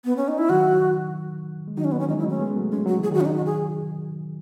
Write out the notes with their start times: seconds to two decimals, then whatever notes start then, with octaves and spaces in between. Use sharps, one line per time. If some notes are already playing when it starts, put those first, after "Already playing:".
0.05 B3
0.17 C#4
0.28 D#4
0.38 E4
0.49 D#3 F#3 F#4
1.68 G#3
1.77 D#3 F#3 D#4
1.84 C#4
1.92 B3
2.00 C#4
2.09 E3 G#3 D#4
2.19 E4
2.24 F#3 A3 C#4
2.40 G#3 B3
2.50 B3
2.56 F#3 A3
2.72 G#3 C#4
2.86 F#3 F#4
2.98 E3
3.04 G#4
3.11 D#3 F#3 F#4
3.21 C#4
3.25 D#4
3.36 F#4
3.46 G#4